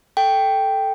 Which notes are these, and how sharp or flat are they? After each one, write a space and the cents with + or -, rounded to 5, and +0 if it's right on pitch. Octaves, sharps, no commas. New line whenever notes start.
A4 +0 G5 +0